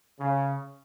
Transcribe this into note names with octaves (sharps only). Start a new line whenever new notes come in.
C#3